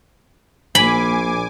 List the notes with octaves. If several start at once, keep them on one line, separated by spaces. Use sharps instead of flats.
A#1 A#2 G#5 B5 D6